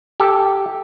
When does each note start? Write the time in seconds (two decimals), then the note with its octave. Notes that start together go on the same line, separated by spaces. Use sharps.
0.20 G4 A4